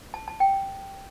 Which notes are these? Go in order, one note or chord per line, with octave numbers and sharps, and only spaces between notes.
A5
A5
G5